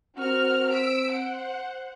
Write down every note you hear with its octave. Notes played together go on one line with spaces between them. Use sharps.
C4 F#4 A#4 F6
E6 B6 D7
C5 F#5